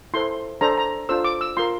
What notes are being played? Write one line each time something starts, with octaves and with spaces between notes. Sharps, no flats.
E4 A4 C5 C6
D4 A4 C5 A#5
A#5
D4 F4 A4 C5 E6
D6
E6
F4 A#4 C6